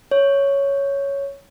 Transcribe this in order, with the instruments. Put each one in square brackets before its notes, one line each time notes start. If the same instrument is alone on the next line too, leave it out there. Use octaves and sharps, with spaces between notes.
[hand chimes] C#5